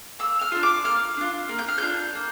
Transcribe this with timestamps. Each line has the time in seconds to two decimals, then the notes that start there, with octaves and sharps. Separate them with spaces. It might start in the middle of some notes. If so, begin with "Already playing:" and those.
0.19 A#3 E6
0.41 F6
0.52 D4 F4
0.63 D6
0.84 A#3 F6
1.17 D4 F4
1.49 A#3
1.59 G6
1.68 F6
1.78 D4 F4 G6
2.15 A#3